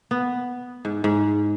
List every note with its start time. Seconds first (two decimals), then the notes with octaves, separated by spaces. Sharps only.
0.11 B3
0.85 G#2
1.04 G#2